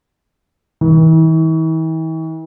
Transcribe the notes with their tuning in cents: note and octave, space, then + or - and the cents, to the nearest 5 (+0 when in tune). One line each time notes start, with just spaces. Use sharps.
E3 -45